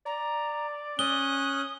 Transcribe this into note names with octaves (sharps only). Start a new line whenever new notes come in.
D5 A#5
C#4 D#6 F#6 G7